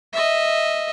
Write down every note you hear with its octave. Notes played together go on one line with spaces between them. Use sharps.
D#5 E5